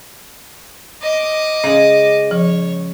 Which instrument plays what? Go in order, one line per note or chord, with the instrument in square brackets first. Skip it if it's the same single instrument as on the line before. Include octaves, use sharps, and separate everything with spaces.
[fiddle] D#5 D6
[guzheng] C#3 G#3 [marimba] C#4
[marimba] F3 [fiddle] C#5